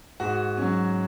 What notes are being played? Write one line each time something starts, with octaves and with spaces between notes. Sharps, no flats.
G#2 F#4
F#3 C#4